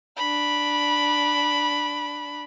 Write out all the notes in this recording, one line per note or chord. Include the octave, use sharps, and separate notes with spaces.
D4 B5